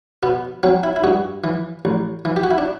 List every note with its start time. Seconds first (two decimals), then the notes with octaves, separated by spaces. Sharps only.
0.23 B2 B3
0.63 F#3 C4
0.83 E4
0.96 E4
1.04 G2 F#4
1.44 E3
1.85 A1
2.25 E3
2.36 G4
2.43 F#4
2.51 E4
2.58 D4